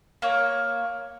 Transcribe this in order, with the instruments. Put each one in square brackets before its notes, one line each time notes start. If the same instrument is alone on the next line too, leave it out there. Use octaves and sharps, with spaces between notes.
[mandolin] A#3 C#5